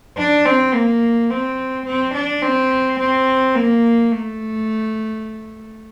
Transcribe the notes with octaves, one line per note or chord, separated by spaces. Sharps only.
D4
C4
A#3
C4
C4
D4
C4
C4
A#3
A3